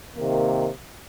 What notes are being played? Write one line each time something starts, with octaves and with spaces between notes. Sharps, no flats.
C3 D#3 A#3